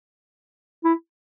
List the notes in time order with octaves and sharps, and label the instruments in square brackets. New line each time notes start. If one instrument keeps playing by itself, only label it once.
[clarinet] E4